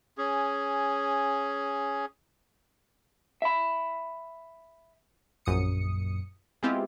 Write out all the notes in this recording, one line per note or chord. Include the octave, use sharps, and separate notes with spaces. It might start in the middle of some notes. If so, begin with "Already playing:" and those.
C#4 G#4
E5 B5
A#1 F#2 D#6 C#7
G#3 B3 C4 E4 F4 G4